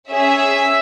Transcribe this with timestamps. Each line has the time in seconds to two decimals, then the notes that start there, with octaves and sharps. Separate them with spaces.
0.11 C#4 G#4 E5